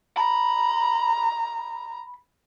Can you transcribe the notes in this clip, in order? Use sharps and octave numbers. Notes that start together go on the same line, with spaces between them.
A#5 B5